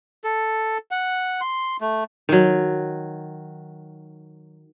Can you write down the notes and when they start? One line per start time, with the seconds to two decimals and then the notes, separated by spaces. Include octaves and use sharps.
0.24 A4
0.91 F#5
1.41 C6
1.81 A3
2.29 D#3 F#3